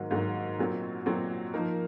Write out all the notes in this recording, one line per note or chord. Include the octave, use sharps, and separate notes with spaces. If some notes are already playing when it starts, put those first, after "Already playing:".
Already playing: G#2 D#3 F#3 A#3
G#2 D#3 F#3 A#3
A#2 F#3 C4 F#4
A#2 F#3 C4 F#4
F3 A#3 D#4 A#4